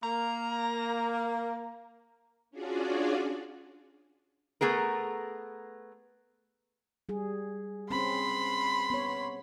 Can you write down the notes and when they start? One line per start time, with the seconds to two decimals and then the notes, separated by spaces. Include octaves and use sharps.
0.03 A#3 A#5
2.51 C#4 D4 F4 F#4 G#4 D5
4.61 A3 B3 G#4 A#4
7.09 G3 G#4
7.90 C4 C#4 G#4 B5 C6
8.90 B3 C#5